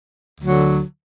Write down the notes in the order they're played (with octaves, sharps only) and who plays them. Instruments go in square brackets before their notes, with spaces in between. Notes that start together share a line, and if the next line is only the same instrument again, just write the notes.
[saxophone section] D2 D3 F#3